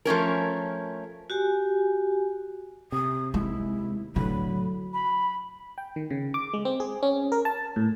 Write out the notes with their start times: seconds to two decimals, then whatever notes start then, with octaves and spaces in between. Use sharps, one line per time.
0.05 F3 A3 C#4 A#4
1.30 F#4 G4 G#5
2.92 C3 D#6
3.34 D#2 G#3 E4
4.16 A2 D3 F#3 B5
4.94 B5
5.78 G5
5.96 D#3
6.11 C#3
6.34 D6
6.54 G#3
6.65 C4
6.80 G#4
7.03 C#4
7.32 A#4
7.45 A5
7.76 A2